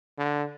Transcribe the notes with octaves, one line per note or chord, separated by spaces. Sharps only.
D3